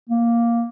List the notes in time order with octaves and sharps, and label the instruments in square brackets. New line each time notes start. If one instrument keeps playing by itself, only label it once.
[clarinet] A#3